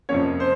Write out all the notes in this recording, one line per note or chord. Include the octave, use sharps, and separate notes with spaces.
F2 C3 F3 A#3 C#4 C#5
C5